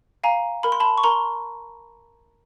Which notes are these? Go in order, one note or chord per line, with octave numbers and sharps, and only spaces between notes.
F5 G#5 A#5
A#4 B5
C6
A5 B5
C#6
A#4 A#5 C6